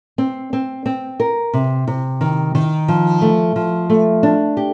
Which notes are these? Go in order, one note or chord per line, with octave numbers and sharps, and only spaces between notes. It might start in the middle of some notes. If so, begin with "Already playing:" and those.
C4
C4
C4
A#4
C3
C3
D#3
D#3
F3
A3
F3
A3
D4
G4